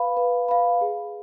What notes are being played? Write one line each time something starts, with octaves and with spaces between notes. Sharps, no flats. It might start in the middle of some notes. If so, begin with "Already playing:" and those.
Already playing: B4 F5 B5
B4
F5 B5
G#4